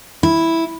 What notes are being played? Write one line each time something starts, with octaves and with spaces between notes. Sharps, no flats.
E4